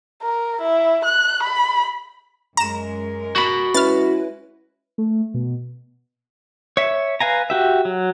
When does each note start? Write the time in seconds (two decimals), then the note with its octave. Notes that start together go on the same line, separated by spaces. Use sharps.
0.23 A#4
0.61 E4
1.04 F#6
1.43 B5
2.57 F#2 G#3 A#4 A#5 E7
3.36 F#4 B5
3.74 G#3 C#4 E4 B4 F6 A6
4.98 A3
5.34 B2
6.77 C#5 E5
7.21 B4 F5 G#5 A#5
7.50 F#4 G4 E5
7.85 F#3